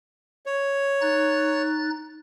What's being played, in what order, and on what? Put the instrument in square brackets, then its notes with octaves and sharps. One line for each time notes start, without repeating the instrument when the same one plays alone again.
[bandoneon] C#5
[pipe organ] D#4 F#6 A6